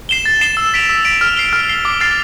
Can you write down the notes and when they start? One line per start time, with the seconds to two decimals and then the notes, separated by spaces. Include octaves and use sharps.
0.09 C7 E7 G7
0.26 A6
0.41 C7 E7 G7
0.57 E6
0.74 B6 D7 F7
0.89 E6
1.05 B6 D7 F7
1.21 F6
1.36 C7 G7
1.53 F6
1.69 C7 G7
1.85 D6
2.00 F6 A6 C7 F7